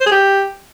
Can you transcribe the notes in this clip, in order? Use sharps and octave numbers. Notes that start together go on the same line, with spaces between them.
C5
G#4
G4